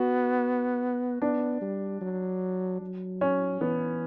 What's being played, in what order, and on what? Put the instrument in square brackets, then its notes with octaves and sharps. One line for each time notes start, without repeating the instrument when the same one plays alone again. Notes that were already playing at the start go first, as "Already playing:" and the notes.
Already playing: [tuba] B3 [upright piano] F#4
[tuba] B3 [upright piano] D4
[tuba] G3
F#3
F#3
[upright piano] C#4
[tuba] E3 [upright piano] B3